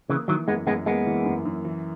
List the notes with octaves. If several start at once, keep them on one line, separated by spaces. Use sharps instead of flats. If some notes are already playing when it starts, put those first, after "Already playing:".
C#3 E3 A#3
D#3 E3 F#3
F#2 G#3 B3
F#2 G#3 B3
G#3 A#3 B3
E3
F#2
F#2
E3